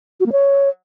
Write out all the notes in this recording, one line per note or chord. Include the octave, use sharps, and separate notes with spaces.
F#4
A#3
C#5